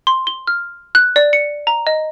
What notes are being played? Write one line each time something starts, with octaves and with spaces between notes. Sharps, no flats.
C6
G7
F6
F#6
D5
C#7
A#5
D#5